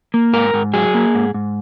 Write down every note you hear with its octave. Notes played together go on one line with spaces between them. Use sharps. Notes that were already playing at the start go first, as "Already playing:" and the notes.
A#3
G#2 A#4
G#2
F#3 G#4
A#3
G#2
G#2